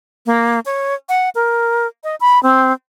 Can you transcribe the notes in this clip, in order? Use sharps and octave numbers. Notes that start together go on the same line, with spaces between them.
A#3
C#5
F#5
A#4
D#5
B5
C4